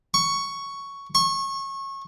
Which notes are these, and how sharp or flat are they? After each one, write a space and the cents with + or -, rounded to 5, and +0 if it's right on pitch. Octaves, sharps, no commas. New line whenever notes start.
C#6 +5
C#6 -25